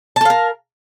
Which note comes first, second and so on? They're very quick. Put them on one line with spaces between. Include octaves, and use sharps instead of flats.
A5 A4 F5 A#4